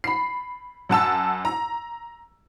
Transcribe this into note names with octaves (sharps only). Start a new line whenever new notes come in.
B5 C7
F#2 F#5 A5 E6
A#5